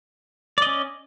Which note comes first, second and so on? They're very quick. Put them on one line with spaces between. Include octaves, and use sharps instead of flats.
D5 D#5 C#4